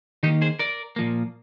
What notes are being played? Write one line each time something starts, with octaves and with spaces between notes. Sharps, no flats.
D#3 A#3 D#4 G4
G#4 C5
A#4 D5
A#2 F3 A#3